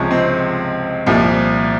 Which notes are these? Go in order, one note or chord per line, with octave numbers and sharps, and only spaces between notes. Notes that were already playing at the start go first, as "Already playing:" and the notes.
Already playing: C#2 C3 F3 G#3 C#4
C4
C2 A#2 F3